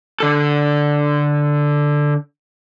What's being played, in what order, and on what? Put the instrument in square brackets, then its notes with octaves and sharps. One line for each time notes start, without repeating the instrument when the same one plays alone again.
[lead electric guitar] D3 A4